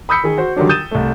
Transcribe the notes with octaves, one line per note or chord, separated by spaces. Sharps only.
B5 D#6 E6 G6 B6 C#7
D#3 G#4
F#4 C5
D3 D#3 F#3 G3 D4
D#6 G6 A6 D#7 E7
C2 A3